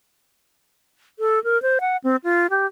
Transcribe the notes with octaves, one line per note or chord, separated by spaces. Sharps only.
A4
A#4
C5
F#5
C4
F4
G4